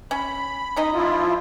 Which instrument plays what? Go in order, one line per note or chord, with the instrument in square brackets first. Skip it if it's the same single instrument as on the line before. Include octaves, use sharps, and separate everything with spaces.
[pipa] C#4 [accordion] B5
[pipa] C#4 D#4 D#5
[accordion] F3 E4 F4